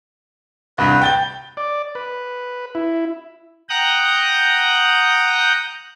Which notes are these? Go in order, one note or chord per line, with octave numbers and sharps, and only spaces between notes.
C2 G2 B4
G5 A6 G7
D5
B4
E4
F#5 G5 A#5 D#6 F#6 G6